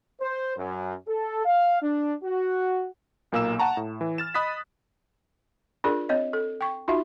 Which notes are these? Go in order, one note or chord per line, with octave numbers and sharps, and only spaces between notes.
C5
F#2
A4
F5
D4
F#4
B1 A#2 A#3 F5 E6 E7
F#5 A5 A#5 C#6
A2
E3
F6 A6 E7
D#5 B5 D#6 F#6 A6 B6
D4 F4 G#4 A#4 D5
C4 C#5 D#5
A4
G5 C#6
D#4 F4 F#4 E5